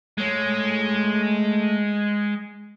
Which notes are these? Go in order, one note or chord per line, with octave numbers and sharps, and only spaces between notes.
G#3 A3 C#5